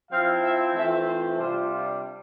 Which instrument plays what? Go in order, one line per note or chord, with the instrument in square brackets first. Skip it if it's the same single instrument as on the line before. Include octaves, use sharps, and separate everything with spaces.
[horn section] F3 C4 E4 F5
E5
E3 A3 C4 F4 E5
C5
C3 G3 D4 F4 C5
F4